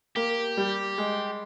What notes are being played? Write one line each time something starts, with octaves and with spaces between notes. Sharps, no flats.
A#3 G4
G3
G#3